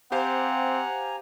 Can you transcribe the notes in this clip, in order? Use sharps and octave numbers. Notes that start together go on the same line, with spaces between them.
C4 G4 C5 F5 F#5 G#5 A#5